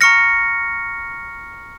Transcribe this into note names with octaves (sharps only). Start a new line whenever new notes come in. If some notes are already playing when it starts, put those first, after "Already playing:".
A#5 C#6 F6 A#6 C#7